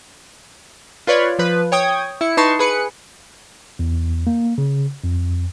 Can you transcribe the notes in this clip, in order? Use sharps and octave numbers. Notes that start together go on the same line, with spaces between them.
F4 B4 C#5 D5
F3 B4
C#5 G5 D#6 G#6
E4 C#7
D#4 B4 A5 C6 C#6
G#4 B4 C#7
E2
A#3
C#3
F2